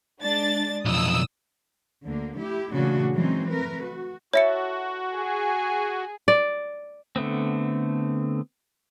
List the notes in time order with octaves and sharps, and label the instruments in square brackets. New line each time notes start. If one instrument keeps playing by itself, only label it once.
[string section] G#3 D4 A6
[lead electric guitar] B1 F2 [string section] D#6 E6
[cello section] D2 D3 A#3
A3 E4 G4
A#2 C#3 E3 A3 D4 F#4
E3 F#3 G#3 C4 C#4 D#4
A3 A#4 B4
F#4
[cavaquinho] E4 A4 [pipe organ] F#4 [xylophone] C#5 E5 C#7
[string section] G#4
[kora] D5
[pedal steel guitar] D3 A3 B3 C4